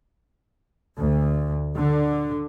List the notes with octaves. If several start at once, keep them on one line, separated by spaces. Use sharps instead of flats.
D2
D3